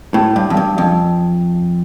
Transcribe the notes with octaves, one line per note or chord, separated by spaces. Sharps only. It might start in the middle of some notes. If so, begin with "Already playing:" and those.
A2
G2
F2
G2
F2